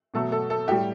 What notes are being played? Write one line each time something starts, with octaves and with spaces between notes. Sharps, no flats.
B2 F#3 A3 A4
A4
A4
A2 G3 G4